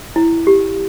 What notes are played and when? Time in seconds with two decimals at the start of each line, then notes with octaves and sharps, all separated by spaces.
0.16 E4
0.47 G4